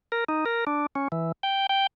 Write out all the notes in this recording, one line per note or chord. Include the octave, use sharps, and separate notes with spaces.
A#4
D#4
A#4
D4
C#4
E3
G5
G5